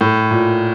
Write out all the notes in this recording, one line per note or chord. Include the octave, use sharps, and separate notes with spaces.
A2
A#2